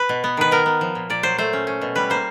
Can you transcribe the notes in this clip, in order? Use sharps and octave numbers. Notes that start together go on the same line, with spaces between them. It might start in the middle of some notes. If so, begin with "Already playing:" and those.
Already playing: B4
B2
B3
D#3 B4
B3 A#4
B3
F3
A#2
A#2 D5
F#3 C5
A3 C5
C#4
C#4
B2
G3 B4
A#3 C5